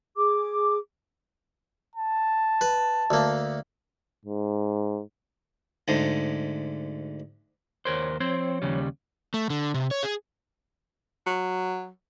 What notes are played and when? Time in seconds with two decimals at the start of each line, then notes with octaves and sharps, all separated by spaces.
0.16 G#4 D6
1.96 A5
2.61 B4
3.11 D2 A#3
4.25 G#2
5.88 D2 G#2 D3
7.85 D#2 A#4 C5 C#5
8.20 F3 C4 C5 C#5
8.62 D#2 C#3 G3
9.34 A3
9.50 D3
9.74 C3
9.91 C#5
10.03 G#4
11.26 F#3